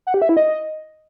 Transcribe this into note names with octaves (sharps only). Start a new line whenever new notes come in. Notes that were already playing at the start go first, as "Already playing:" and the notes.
F#5
G4
E5
E4
D#5